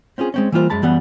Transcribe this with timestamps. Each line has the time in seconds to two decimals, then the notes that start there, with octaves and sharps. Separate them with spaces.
0.18 C4 C#4 F4 G#4
0.34 G#3 C4 C#4
0.52 E3 G3 A#3 F4 C5
0.70 F#2 G#3 A5 B5
0.82 F#2 E3 G3 B3 F5 F#5